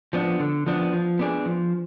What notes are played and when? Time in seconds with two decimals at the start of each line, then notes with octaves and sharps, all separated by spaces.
0.13 F3 B3 D4
0.40 D3
0.67 F3 B3 D4
0.93 F3
1.19 B3 D4 G#4
1.46 F3